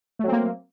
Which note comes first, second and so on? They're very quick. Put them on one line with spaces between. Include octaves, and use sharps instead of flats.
A3 F#3 C4 A#3